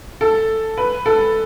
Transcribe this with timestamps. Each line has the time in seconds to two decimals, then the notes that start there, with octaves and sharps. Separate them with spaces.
0.21 A4
0.77 B4
1.06 A4